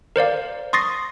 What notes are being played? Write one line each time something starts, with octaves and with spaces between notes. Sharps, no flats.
A#4 C5 D5 F5
C6 C#6 D#6 A6 A#6 C7